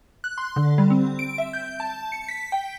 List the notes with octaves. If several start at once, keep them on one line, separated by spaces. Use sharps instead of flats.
F#6
C6
D3
G3
C4
D7
E5
G6
A5
C#7
B6
G5